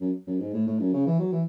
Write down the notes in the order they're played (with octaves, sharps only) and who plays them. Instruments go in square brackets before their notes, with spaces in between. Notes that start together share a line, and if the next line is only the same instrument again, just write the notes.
[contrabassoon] F#2
F#2
G#2
A2
A2
F#2
C#3
E3
F#3
E3